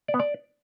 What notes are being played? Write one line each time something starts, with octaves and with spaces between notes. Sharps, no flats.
D5
B3
D5